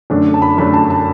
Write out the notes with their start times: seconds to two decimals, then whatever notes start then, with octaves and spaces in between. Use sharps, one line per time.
0.10 F#2 D3 A3 D4
0.34 A5
0.42 B5
0.58 F#2 D3 A3 D4 B5
0.74 A5
0.90 A5